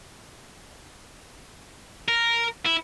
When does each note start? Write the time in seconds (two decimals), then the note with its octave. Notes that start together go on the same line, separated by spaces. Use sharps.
2.08 A#4
2.66 E4